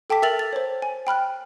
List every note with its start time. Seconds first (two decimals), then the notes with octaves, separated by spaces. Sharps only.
0.10 A4 G5 A5 D6 B6
0.22 A#4 E5 E6 A6 F7 F#7
0.39 A6
0.53 C5 C#5
0.82 G#5
1.07 G5 B5 F6 F#6